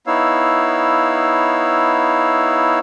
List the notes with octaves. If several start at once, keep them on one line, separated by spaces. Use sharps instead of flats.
B3 D#4 E4 C#5 F5 E6